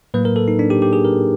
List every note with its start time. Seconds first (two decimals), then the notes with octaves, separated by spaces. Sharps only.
0.14 A2 F#3 A#3 B4
0.25 A#4
0.36 A4
0.48 D#4
0.59 D4
0.70 G4
0.82 G4
0.93 G#4
1.04 A#4